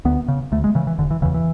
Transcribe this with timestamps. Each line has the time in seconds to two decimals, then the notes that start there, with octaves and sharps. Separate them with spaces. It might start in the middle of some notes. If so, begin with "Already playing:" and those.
0.05 D2 B3
0.28 C#3
0.52 D2 A3
0.64 G#3
0.75 C#3 E3
0.87 E3
0.98 E1 D3
1.11 E3
1.22 C#3 E3
1.25 E2
1.34 E3